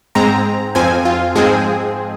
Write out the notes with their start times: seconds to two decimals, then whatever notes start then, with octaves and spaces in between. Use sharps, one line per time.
0.15 G#2 G#3 C4 A#5
0.75 F2 F3 C4 G#5
1.05 F4
1.35 G#2 F3 G#3 C4 G#4